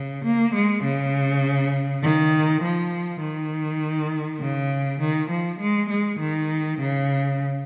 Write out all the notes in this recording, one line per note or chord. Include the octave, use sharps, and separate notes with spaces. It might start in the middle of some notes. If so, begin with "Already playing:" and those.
Already playing: C#3
A#3
G#3
C#3
D#3
F3
D#3
C#3
D#3
F3
G#3
G#3
D#3
C#3